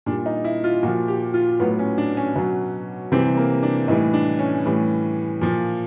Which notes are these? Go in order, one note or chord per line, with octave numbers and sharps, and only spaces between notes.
A#2 G3 D4
D#4
E4
F4
A#2 F3 F#4
G4
F4
A2 F#3 B3
C#4
D4
C#4
B2 F#3 C#4
C3 E3 G3 C4
A#3
D4
A2 E3 G3 D#4
D4
C#4
A2 E3 G3
A#2 F3